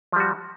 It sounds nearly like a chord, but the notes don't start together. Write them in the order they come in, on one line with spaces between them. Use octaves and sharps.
F3 G3 F#4